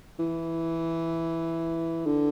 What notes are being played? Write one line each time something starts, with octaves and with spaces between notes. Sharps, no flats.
E3
D3